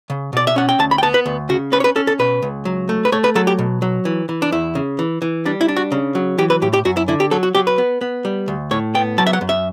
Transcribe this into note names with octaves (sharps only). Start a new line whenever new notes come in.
C#3
B2 D5
E5
C#4 F#5
G5
D2 A5
B5
G5
B3 A5
B4
D2
C#3 F#4
C#4 B4
C#5
B4
C#4 A4
A4
B2 B4
C#2
F#3
A3
B4
A3 C#5
B4
F#3 A4
G4
B2
F#3
E3
E3
D4
E2 E4
C#3
E3
E3
G3 D4
E4
D4
F#4
C#3
F#3
E3 G4
B4
A2 G4
G4
F#2 F#4
E4
D3 E4
G4
F#3 A4
F#4
F#3 G4
B4
B3
B3
G3
D2
A2 C#5
B3 G5
F#3 A5
E5
F#5
F#2
E5